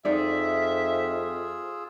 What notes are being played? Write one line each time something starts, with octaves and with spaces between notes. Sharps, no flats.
F2 D#4 F4 G#4 D5 E5 E6